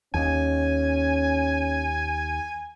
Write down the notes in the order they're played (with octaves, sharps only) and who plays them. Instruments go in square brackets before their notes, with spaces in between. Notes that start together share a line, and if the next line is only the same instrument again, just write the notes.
[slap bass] D#2 [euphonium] C#4 [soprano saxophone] G#5